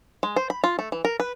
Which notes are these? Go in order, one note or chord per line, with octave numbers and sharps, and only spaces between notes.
G#3
C5
B5
F4
A3
E3
A#4
B4